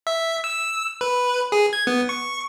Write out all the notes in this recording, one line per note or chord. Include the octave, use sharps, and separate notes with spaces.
E5
E6
B4
G#4
G#6
B3
C#6